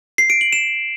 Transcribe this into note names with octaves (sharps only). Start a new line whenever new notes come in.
C7
D7
F#7
E7